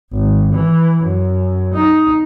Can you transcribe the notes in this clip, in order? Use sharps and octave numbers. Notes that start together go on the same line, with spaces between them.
G#1
E3
F#2
D#4